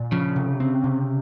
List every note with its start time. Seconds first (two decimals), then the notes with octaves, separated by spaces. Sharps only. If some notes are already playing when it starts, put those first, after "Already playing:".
Already playing: A#2
0.12 C#3 F3
0.36 C3
0.60 C4
0.84 C3